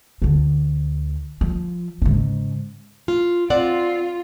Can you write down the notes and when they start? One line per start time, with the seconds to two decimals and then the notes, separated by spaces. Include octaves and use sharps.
0.22 D2 D3
1.41 F3
2.02 G#2 C#3
3.08 F4
3.50 C4 F4 D5 F#5